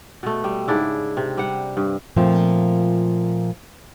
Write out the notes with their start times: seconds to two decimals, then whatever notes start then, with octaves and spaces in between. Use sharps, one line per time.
0.23 B2 A3
0.44 G3
0.68 G#2 C#3 D4 E4
1.17 C3
1.37 G3 F#5
1.77 G2
2.16 A#2 F3 A3 A#3 C4